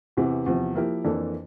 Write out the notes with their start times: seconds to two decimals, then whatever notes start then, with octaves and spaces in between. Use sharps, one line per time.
0.17 E2 C3 E3
0.46 E2 C3 F3
0.75 F3 A#3 E4 G4 A#4
1.04 F2 E3 A#3 D4 A4